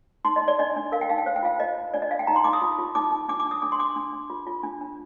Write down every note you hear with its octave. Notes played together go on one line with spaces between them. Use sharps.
D#4 C6
D#5
D#4
D5
D4 D#5
D4
A#4 F5
G5
D#4 F5
G5
C5 F5
G5
F4 F5
C5 D#5
F4
D4 D5
D#5
D4 F5
G5
D#4 A#5
C6
D#4 D6
D#6
F4
F4
D#4 D6
D#4
D4 D6
D6
D4
D#6
D4 D6
C6
D4 D6
D4
D4
F4
F4
D4
D4